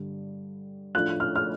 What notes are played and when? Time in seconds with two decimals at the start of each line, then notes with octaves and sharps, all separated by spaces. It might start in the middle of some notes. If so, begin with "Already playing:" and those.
Already playing: G2 D3 G3
0.94 A2 F3 A3 D4 F#6
1.20 F6
1.36 F6